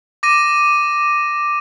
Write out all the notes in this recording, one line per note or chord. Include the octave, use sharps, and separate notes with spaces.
D6 A#6 D#7